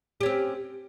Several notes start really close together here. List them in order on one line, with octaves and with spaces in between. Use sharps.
G4 C#4 C4